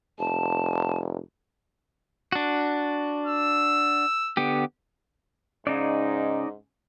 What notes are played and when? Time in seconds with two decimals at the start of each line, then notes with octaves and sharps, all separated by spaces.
0.19 F1 A5
2.32 D4 F#4
3.27 E6
4.37 D3 B3 G4
5.67 G#2 C#3 D#4 D5